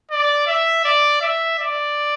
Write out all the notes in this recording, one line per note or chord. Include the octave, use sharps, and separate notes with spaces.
D5
E5
D5
E5
D5